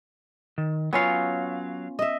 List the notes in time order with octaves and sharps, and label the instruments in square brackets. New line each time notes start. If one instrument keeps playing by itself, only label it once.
[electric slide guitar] D#3
[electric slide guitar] F#3 F5 [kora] B3 C#4 F4
[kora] D#5 E5